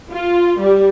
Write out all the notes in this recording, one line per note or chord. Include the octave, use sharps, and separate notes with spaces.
F4
G3